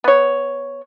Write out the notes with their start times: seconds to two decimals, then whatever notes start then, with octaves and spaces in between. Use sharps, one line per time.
0.04 B3 C#5